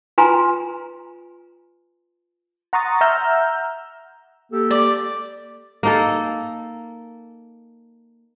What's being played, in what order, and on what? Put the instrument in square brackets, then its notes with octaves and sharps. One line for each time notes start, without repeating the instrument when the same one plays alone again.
[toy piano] F4 B4 G#5 A#5 C6
[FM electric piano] F#5 A#5 C6 C#6 D#6 A6
E5 F#5 A#5 E6 F6 G6
[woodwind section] A#3 G4 A4
[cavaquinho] D5
[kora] A#3 D#4 A4